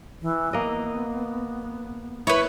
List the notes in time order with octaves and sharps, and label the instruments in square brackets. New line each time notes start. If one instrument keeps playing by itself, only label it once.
[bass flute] E3
[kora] A#3 D#5 [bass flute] B3
[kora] E4 [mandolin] B4 C#5